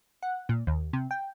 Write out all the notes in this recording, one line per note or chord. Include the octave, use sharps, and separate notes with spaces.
F#5
A#2
D#2
C3
G5